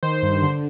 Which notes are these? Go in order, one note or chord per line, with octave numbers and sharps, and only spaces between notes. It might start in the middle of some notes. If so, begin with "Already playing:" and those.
D#3 C5
G2
D3